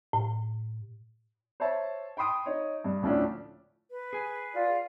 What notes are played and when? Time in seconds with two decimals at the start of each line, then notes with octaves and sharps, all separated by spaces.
0.13 A2
1.60 C5 C#5 E5 A5
2.17 G5 B5 C6 D#6 D7
2.46 D#4 C#5
2.84 G2
3.02 D2 A2 F3 A3 C#4 D4
3.91 B4
4.13 G#4 G#5
4.53 F4 D5